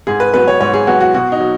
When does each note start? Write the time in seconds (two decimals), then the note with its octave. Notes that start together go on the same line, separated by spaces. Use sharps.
0.07 G#2 G#4
0.20 B4
0.34 F#3 B3 B4
0.48 C#5
0.61 G#2 C#5
0.74 G#4
0.87 F#3 B3 F#4
1.00 F#4
1.14 B2 F#4
1.32 D#4
1.40 F#3